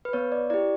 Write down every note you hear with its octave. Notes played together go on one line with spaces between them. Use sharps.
B4
B3 C#5
D5
E4 G4 D5